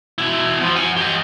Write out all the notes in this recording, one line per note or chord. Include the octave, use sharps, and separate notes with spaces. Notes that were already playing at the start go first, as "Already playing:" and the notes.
B2 E4
F3
F#5 G#5
G4 D#5